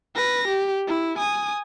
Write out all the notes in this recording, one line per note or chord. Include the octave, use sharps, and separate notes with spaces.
B4 A#6
G4
E4
G#5 D#6